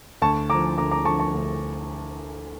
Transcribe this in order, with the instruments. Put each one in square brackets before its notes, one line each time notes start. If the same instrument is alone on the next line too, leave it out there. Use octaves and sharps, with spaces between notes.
[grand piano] D2 A5 C#6
D3 A#5 D6
F3
D2 A#5 D6
A#5 D6
D3 F3 A5 C#6
A5 C#6
D2